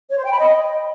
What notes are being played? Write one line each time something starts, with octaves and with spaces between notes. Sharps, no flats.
C#5
C5
G5
B5
D#5